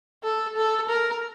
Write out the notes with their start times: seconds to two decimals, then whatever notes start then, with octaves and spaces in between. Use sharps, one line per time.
0.24 A4
0.57 A4
0.89 A#4